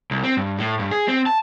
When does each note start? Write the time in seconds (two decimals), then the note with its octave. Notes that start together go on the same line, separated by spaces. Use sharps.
0.11 C2
0.24 C4
0.37 G2
0.59 A2
0.79 G2
0.91 G#4
1.08 C4
1.26 A5